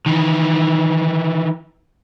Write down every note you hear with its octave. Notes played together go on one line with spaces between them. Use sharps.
D#3 E3